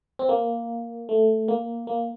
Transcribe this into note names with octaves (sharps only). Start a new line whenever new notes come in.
C4
A#3
A3
A#3
A#3